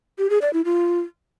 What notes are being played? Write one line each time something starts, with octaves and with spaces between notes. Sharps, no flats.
G4
G#4
D5
E4
F4